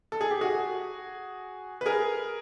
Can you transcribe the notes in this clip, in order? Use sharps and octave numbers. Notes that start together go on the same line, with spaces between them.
A4
G#4
G4
F#4 G#4
B4
G#4 A#4